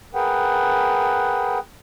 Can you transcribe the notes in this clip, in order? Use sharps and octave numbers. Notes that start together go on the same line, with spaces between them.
G#4 A#4 B4 F#5 G5